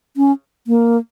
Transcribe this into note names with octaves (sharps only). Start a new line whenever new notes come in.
C#4
A#3